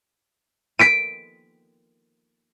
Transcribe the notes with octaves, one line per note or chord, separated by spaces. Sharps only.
B6 D7 D#7